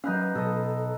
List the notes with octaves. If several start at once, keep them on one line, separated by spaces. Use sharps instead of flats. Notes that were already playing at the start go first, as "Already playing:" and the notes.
F#3 C#4 D#4 B4 F5
B2 F#3 A4 D#5